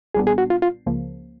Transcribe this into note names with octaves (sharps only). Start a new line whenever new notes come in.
B1 A#2 G3 B3 D4 G#4
G#4
F#4
F4
F4
C#2 C#3 F3 A#3